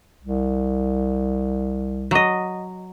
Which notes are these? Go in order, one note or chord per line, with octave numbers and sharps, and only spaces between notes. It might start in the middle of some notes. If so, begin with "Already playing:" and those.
C2
F#3 D#5